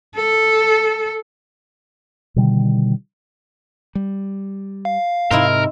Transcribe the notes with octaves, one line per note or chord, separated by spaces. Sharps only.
A4
B2 D3 D#3 G3
G3
F5
G#2 C3 C4 D#4 E4 A#4